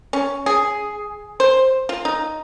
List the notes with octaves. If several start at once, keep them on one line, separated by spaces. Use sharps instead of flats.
C#4
G#4
C5
F4
D#4